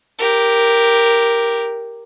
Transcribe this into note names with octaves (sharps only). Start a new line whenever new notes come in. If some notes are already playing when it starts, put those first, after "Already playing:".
G4 A#4